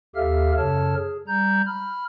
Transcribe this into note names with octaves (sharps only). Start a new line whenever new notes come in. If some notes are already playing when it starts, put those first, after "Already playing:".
D#2 G4 A4 E5 F5 F6
F#2 C#3 A4 C#5 A5 F6
G#4
G3 A#5 G6
B5 F6